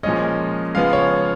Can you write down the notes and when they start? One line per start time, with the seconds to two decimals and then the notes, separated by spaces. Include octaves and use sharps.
0.03 A#2 F3 G#3 C#4 D#5
0.75 C#3 F3 G#3 B3 F5
0.93 C#5